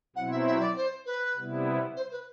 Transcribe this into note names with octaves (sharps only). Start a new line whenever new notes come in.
B2 F#3 C4 E4 F#5
E5
E5
D5
C5
B4
C3 G3 B3 E4
C5
B4